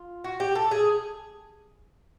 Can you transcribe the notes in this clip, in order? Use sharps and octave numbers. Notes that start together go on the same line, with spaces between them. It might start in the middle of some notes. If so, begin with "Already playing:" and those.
Already playing: F4
F#4
G4
A4
G#4